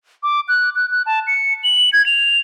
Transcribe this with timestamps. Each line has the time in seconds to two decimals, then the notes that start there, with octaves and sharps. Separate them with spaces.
0.23 D6
0.48 F#6
0.76 F#6
0.91 F#6
1.06 A5
1.27 C#7
1.64 F#7
1.93 G#6
2.06 F7